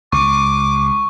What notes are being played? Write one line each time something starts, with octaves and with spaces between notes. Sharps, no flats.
C#2 C#6 D6